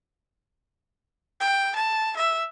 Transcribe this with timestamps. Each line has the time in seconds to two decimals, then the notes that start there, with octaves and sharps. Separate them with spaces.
1.40 G5
1.76 A5
2.17 E5